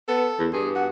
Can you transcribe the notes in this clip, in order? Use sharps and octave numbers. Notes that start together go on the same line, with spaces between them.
B3 A4
E2
G2 G#4
F#4